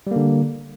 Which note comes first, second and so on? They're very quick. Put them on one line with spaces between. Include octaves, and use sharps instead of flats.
G3 A#3 D3